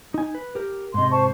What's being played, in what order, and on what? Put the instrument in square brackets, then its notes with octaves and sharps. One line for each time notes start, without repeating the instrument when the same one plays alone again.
[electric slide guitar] D#4 G#5
B4
G4 A#4
[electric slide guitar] G#2 C3 [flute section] D#5 C6
[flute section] C5 A5 C#6